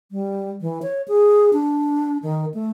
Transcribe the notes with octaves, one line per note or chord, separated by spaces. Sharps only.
G3
E3
C#5
G#4
D4
D#3
A3